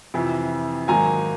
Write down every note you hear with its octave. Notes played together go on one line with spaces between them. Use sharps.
F2 C3 E3
G#2 D#3 F#3 A#3 G#5 A#5